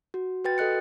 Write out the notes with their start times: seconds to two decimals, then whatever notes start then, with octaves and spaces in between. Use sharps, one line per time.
0.14 F#4
0.45 F#4 B4 G5 A6
0.58 A4 D#5 F#6 C#7